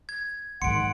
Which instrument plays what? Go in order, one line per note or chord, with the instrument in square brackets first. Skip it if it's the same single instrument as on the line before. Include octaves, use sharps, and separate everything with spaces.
[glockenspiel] G#6
[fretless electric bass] B1 G#2 D#3 [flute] F#5 [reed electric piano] C6 [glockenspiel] C#7 D7